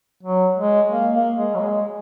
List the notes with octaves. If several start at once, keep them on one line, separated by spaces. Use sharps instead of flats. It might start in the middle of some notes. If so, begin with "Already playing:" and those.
F#3
G#3
A#3
A#3
G#3
F#3
G#3